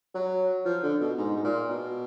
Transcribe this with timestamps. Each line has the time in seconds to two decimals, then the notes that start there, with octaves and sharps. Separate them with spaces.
0.15 F#3
0.65 F3
0.83 D3
1.00 B2
1.18 G#2
1.36 G#2
1.44 A#2
1.69 B2